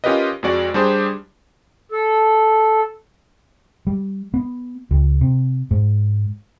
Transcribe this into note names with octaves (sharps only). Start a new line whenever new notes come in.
C#4 F4 G4 A#4 B4 D#5
F2 G#3 F#4 D5
G3 D4 G4 G#4 C5 C6
A4
G3
B3
C#2
C3
G#2